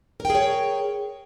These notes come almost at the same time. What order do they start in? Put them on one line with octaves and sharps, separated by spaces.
A#4 G5 G#4 C#5